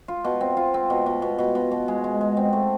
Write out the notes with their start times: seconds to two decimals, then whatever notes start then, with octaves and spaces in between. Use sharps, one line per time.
0.08 F4
0.24 B2
0.41 C4
0.57 F4
0.74 C4
0.90 B2
1.06 B2
1.22 B2
1.38 B2
1.55 B2
1.71 B2
1.88 G#3
2.04 G#3
2.21 G#3
2.37 C4
2.53 A3